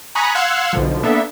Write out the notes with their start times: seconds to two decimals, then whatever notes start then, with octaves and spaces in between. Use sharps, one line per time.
0.15 G#5 A#5 B5 C#6 D#6 F#6
0.35 F5 F#5 C6 E6 F#6 G#6
0.73 B1 B2 D3 F3
1.03 A#3 B3 D4 A4 E5